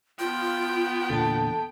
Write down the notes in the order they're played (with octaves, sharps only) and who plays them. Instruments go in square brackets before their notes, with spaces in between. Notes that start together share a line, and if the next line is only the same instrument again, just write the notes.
[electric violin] B3 G5 [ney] F4
[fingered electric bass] E2 A#2 D3 [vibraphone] A4 A5